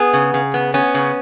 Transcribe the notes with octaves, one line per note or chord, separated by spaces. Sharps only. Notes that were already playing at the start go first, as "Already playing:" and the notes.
Already playing: B3 G#4
C#3
C#3
B3
B3 C#4
C#3